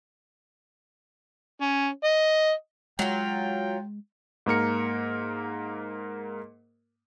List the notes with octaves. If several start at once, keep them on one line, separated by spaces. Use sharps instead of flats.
C#4
D#5
F#3 G#3 F4 G5
G#2 A#3 A#4 C#7